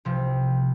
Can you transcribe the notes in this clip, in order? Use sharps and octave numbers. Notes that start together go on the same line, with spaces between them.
C2 C3 F3